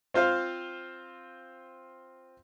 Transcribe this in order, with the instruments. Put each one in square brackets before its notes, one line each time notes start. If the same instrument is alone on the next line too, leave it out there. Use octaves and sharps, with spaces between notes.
[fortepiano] C4 F4 C5 F5